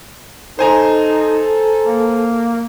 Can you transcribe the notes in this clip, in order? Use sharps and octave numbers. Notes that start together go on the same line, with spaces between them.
D#4 A4 C5 G#5 A#5
A#3